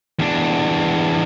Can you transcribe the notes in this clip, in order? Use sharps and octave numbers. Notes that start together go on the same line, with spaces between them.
E2 D4